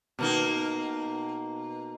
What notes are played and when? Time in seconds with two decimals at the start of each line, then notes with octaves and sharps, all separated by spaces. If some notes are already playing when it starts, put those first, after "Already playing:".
0.19 B2 A#3 D#4